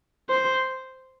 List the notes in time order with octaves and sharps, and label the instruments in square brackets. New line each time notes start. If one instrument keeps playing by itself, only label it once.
[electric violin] C5